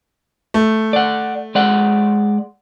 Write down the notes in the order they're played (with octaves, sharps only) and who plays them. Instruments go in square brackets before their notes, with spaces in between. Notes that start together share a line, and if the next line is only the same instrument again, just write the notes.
[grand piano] A3
[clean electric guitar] D5 F#5
G#3 D5 F#5